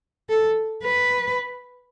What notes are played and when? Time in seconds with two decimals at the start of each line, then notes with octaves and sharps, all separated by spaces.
0.30 A4
0.83 B4